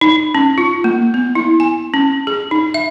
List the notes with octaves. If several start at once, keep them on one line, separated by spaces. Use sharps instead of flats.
D#4
C#4
F4
A#3
B3
E4
G#5
C#4
G#4
D#4
E5